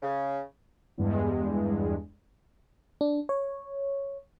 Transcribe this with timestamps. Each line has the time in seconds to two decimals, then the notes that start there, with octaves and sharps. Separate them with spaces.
0.02 C#3
0.98 E2 G2 G#3
3.01 D4
3.29 C#5